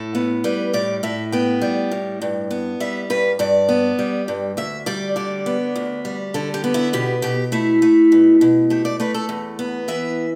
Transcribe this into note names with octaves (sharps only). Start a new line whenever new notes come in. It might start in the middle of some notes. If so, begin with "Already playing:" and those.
Already playing: A2 A4
B3
G3 B4
A2 D5
A2 E5
B3 G5
G3
A2
G2
B3
G3 E5
G2 B4
G2 D5
B3
G3
G2
D2 E5
G3 D5
D3 D5
B3
D2
G3
D3 A4
G4
B3
E4
B2 G4
B2 G4
A3 E4
A3
B2
B2
A3 G4
D5
A3 B4
A4
E2
B3
E3 E5